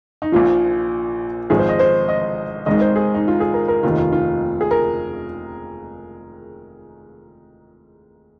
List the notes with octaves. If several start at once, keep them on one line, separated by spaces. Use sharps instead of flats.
D#4
A#1 A#2 F3 F4
G#1 G#2 F3 G#4
C5
D#5
C5
D#5
G#1 G#2 D#3 D#5
C5
G#4
D#4
F4
G#4
A#4
A#4
F1 D#2 D#3 F4
F4
F4
G#4
A#4